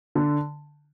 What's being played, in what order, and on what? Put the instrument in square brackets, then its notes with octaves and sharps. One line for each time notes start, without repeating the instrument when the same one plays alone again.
[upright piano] D3